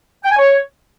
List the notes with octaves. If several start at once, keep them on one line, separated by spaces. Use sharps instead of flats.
G5
G#5
C#5